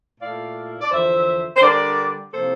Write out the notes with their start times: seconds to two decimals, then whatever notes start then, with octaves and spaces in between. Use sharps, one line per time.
0.20 A#2 A3 E4 D5 F5
0.81 D5
0.91 E2 D3 F3 C5 E5
1.56 C5
1.62 D3 G3 D4 A#4 D5
2.33 C3 F3 A#3 E4 A4 C5